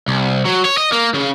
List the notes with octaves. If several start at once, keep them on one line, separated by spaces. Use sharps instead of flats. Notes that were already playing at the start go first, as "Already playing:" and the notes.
C2
F#3
C#5
D#5
A#3
C#3